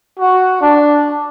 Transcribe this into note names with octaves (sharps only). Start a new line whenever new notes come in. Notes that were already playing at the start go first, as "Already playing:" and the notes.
F#4
D4